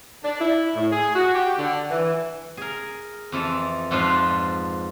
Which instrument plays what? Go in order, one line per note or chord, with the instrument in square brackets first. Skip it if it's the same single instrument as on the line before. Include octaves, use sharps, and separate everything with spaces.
[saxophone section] D4
E4
A2
G#4
F#4
G4
D3
E3
[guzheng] G#4 A#4
F2 E3 A4
F2 G#2 F3 D4 B4 F5